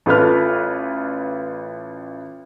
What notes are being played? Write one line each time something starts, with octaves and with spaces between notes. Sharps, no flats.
A1 F4 A4 B4 B5 F6